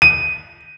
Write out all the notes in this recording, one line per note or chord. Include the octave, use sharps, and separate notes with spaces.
D#7